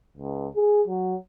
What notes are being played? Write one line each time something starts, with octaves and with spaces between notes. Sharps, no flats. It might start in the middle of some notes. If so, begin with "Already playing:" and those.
C#2
G#4
F#3